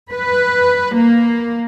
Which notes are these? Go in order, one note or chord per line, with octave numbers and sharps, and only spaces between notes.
B4
A#3